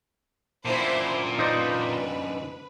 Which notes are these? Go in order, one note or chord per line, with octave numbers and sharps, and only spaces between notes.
F#2 A#2 D3 E4 C5
D#4 B4 C5 D5